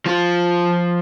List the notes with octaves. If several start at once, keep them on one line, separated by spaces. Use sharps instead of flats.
F3 F4